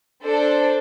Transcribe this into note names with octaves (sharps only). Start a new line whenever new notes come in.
D4 A4 C5